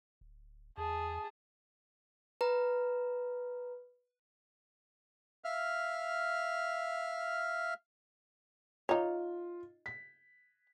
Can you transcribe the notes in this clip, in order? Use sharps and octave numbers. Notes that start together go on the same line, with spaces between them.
D1
E2 G#4 A5
B4 A#5
E5 F5 F6
D#4 F4 C#5
B6